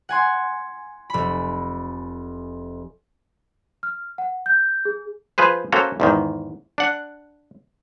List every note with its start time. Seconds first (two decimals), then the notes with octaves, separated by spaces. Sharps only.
0.09 F#5 G#5 C6
1.10 F1 B5
3.83 F6
4.18 F#5
4.46 G6
4.85 G#4
5.38 F3 F4 G#4 B4 C5
5.72 A#3 C#4 F#4 A4 C5 F5
6.00 E2 G#2 D#3
6.78 D4 F#5